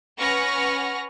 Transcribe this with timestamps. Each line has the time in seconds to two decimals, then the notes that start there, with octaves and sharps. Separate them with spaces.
0.18 C#4 B4 F#5 C#6 F6 A#6